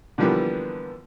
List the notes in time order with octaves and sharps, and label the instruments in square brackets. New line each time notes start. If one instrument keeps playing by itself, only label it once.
[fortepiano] D3 E3 F3 G3 A#3 B3